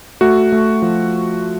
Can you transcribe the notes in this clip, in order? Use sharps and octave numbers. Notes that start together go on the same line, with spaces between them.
A3 F#4
A3
F3